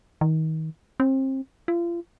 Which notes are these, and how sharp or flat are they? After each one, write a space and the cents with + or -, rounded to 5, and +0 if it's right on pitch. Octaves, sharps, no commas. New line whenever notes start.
D#3 +30
C4 +30
F4 -35